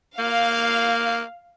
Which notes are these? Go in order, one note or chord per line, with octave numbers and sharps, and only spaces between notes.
A#3 F5